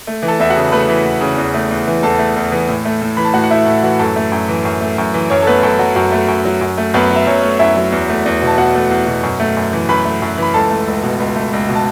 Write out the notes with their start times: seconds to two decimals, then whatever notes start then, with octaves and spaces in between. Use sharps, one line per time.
0.07 A3
0.23 E3
0.28 A4 A5
0.39 E2 E5
0.50 F#4 F#5
0.56 C#3
0.72 A3 B4 B5
0.88 E3
1.05 E2
1.21 C#3
1.38 E2
1.54 A3
1.71 E2
1.87 E3
2.03 E2 A4 A5
2.19 A3
2.36 E2
2.52 E3
2.68 A2
2.85 A3
3.02 A2
3.17 E3 B5
3.25 A5
3.33 A2 F#4 F#5
3.44 F#5
3.50 A3 E4 E5
3.66 A2 A4
3.83 E3 F#4
3.99 F#2 A4
4.16 A3
4.32 F#2
4.49 E3
4.65 F#2
4.81 A3
4.98 F#2
5.14 E3
5.30 F#2 C#4 C#5
5.42 A4
5.47 A3 B3 B4
5.63 F#2 A4
5.79 F#3 F#4
5.95 F#2 F#4
6.12 A3
6.28 F#2
6.45 F#3
6.61 F#2
6.78 A3
6.94 F#2 B3 B4
7.11 F#3 E5
7.27 F#2 C#4 C#5
7.43 A3
7.59 F#2 E4 E5
7.76 F#3
7.92 E2
8.09 A3
8.26 E2
8.42 B2
8.47 A5
8.57 E2 F#4 F#5
8.75 A3
8.90 E2
9.07 B2
9.23 F#2
9.40 A3
9.57 F#2
9.73 E3
9.89 F#2 B4 B5
10.05 A3
10.22 F#2
10.38 E3 B5
10.54 C#2 A4 A5
10.70 A3
10.88 C#2
11.03 B2
11.20 C#2
11.36 A3
11.53 C#2
11.69 B2
11.75 A5